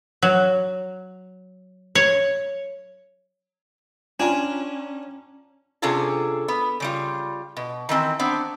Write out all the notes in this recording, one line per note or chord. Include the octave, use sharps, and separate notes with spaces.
F#3
C#5
C#4 D4 F4 G5 G#5 A#5
C3 C#4 D4 F4 G#4 A4
B3
C#3 G3 F4
B2
D#3 E3 C4 A5
B3 C4 D4